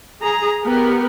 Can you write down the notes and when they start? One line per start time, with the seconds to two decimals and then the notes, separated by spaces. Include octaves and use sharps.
0.22 G#4 A#5
0.63 B3 G4 A#4 B4